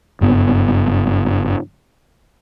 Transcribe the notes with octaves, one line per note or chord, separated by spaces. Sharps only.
F#1 G2 B3